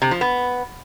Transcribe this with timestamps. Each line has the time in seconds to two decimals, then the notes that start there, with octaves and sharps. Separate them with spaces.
0.02 C3
0.11 F3
0.21 B3